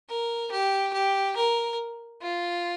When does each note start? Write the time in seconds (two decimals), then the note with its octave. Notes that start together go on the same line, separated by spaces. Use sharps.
0.09 A#4
0.51 G4
0.93 G4
1.36 A#4
2.22 F4